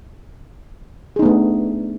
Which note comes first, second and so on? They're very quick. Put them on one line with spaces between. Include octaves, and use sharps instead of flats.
G#4 D#4 B3 A3 D4